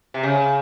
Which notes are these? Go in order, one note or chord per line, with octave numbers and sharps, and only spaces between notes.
C3
C#3